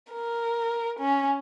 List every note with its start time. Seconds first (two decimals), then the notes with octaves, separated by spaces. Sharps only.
0.12 A#4
1.00 C#4